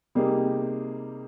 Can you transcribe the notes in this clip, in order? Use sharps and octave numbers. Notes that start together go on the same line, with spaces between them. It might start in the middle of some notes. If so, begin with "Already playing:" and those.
C3 G3 A#3 D#4 G#4